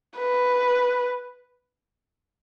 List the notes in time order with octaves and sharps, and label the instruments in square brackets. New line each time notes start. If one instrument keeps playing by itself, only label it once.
[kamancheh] B4